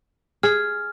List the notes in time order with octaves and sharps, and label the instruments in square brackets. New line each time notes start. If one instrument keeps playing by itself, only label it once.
[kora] G#4 [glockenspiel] F6